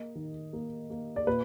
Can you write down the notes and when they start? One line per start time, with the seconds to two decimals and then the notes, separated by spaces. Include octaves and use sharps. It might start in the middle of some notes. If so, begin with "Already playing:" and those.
Already playing: A#3 D#5
0.15 D#3
0.53 A#3
0.90 A#3
1.16 D5
1.27 A#2 B4